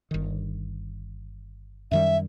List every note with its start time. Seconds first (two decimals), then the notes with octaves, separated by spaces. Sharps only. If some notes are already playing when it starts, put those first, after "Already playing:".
0.11 G1 D#3
1.91 F#2 D#3 G3 E5